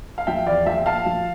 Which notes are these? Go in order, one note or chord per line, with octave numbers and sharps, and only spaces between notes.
F5
F3 E5 G5
E2 D5 F5
F3 E5 G5
A#2 F5 A5
F3